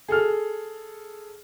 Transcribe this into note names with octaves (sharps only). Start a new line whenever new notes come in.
G#4 A4 F6